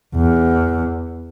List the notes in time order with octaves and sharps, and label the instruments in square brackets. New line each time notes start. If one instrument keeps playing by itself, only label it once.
[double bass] E2